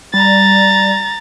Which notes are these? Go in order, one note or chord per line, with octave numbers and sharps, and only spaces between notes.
G3 A#5 A6